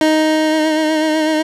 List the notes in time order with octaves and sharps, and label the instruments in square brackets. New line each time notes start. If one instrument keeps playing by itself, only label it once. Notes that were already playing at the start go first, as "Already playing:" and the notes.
[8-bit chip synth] D#4